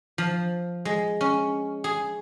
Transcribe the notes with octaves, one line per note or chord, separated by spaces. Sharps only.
F3
G#3
C#4
G#4